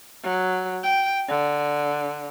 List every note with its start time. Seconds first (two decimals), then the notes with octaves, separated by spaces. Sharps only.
0.23 F#3
0.83 G5
1.28 D3